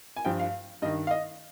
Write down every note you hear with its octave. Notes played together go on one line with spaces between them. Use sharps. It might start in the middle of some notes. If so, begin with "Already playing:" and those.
G#5
G2 F3 G5
F5
G2 D#3 D#5
F5
D#5